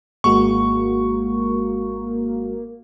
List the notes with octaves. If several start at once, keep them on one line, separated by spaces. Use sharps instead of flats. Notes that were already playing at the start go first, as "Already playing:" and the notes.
G#1 G#3 A#3 F#4 C#6